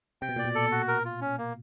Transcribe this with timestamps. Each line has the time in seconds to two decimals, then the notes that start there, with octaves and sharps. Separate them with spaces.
0.22 C3 G5
0.29 B2
0.36 A#2 D5
0.45 B2
0.55 A4
0.71 F#4
0.88 A#4
1.05 F4
1.21 C#4
1.38 A#3